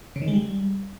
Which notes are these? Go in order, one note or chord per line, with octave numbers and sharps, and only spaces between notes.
C#3
D#3
G#3
G3